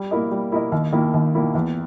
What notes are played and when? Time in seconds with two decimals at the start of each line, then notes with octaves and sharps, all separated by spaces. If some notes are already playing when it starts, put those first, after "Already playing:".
Already playing: G3
0.11 A#3 E4 A#4 D#5
0.31 G3
0.51 A#3 E4 A#4 D#5
0.72 D#2
0.92 D#3 A#3 E4
1.14 D#2
1.35 D#3 A#3 E4
1.55 E2